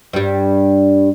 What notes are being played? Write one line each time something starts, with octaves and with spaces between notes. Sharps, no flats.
G2 G3